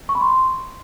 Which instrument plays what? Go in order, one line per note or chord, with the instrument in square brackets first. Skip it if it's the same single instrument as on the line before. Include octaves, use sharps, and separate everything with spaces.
[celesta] C#6
B5
C6